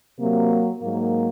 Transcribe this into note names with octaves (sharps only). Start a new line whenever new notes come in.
C3 F#3 A#3
G#2 F#3 A#3